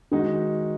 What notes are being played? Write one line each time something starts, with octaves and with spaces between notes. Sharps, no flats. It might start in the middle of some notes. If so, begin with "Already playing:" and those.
D#3 G#3 D#4 F#4